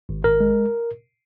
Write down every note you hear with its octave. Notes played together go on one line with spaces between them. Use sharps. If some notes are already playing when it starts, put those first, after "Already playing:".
G#1
G#1 A#4
G#3